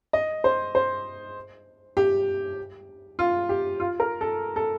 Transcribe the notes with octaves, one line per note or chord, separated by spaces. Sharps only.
D#5
C5
C5
G4
F4
G4
F4
A#4
A4
A4